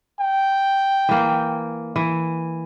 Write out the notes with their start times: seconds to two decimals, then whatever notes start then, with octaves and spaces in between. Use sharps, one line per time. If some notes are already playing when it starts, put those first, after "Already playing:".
0.20 G5
1.09 E3 A#3
1.96 E3